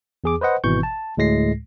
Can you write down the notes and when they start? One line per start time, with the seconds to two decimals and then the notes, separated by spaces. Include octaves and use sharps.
0.24 E2 G#4 D6
0.41 B4 C5 D#5 F#5
0.64 G#1 B2 E3 C#6 G6
0.83 A5
1.17 D2 A2 G#3 A#6 C7